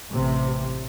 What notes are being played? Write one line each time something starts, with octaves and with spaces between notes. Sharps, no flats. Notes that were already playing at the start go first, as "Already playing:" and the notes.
A1 C3